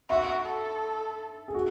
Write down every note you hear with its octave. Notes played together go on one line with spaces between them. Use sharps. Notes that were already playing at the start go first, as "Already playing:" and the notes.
F#4 E5
A4
G#4
F#4